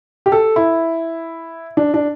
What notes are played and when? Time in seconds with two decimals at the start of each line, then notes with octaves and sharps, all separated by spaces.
0.26 G4
0.32 A4
0.56 E4
1.77 D4
1.94 D4